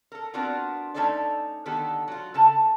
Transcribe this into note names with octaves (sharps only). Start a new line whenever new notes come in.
A4 A#4
B3 C4 D4 F4 F#4 A#4
A3 C#4 D#4 A4 C5 D5
D3 D#3 B3 G4 A4
F#3 F4
C#3 A4 A5